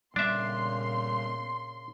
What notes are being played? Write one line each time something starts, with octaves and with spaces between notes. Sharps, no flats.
A#2 C#3 G3 B3 D4 E5 C6